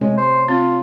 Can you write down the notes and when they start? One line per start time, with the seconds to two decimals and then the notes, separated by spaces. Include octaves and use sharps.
0.01 C3 G#3 A3 C#4
0.18 C5
0.48 C4 F4